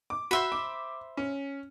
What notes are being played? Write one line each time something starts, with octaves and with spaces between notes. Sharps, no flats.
D6
F#4 C5 E5 B5
D6
C#4